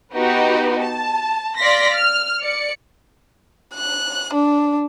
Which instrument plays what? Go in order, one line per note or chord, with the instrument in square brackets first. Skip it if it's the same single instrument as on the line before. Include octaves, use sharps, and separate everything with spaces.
[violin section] B3 D#4 F#4 G4 B4
A5
D5 F5 C6 A#6 B6
F6
D5 C#7
[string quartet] F#6
D4